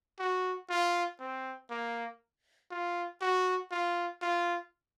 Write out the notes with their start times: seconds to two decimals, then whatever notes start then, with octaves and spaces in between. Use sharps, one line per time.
0.19 F#4
0.69 F4
1.20 C4
1.70 A#3
2.71 F4
3.21 F#4
3.71 F4
4.22 F4